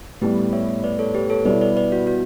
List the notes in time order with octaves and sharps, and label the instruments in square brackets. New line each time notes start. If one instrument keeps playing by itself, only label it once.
[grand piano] A2 G3 B3 [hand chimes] G4 B4
[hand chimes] C#5 E5
B4 D5
A4 C#5
G4 B4
A4 C#5
[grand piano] B2 G3 B3 E4 [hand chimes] B4 D5
[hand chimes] B4 D5
B4 D5
F#4
F#4